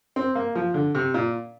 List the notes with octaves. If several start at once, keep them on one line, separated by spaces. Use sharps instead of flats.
C4
A#3
F3
D3
C3
A#2